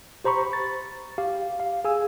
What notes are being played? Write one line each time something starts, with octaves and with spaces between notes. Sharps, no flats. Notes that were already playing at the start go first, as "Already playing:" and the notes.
G4 C5 A#5 B5 C#6
A6
G4 F5
F5
G#4 G#5 E6